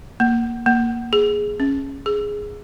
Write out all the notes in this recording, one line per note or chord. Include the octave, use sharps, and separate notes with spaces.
A#3
A#3
G#4
C#4
G#4